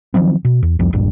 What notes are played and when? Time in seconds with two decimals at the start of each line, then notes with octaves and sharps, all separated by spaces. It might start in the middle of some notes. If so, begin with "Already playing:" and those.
0.14 D#3 F3 F#3 C4
0.45 B2
0.63 E2
0.79 C2 F2 F3
0.93 E1 A#1 G2 D4